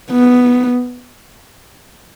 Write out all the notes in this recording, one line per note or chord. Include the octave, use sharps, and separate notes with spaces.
B3